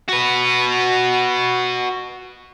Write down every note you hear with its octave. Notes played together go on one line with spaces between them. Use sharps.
F#4 B4